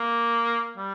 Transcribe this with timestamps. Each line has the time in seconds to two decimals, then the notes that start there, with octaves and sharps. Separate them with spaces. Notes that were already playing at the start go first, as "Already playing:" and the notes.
Already playing: A#3
0.77 G3